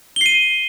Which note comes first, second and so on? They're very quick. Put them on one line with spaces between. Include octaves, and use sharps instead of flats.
G7 C7 D#7